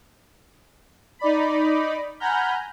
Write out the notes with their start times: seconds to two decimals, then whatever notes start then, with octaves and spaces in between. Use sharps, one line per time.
1.19 D#4 D5 B5
2.20 F#5 G#5 A#5 B5 F6 G6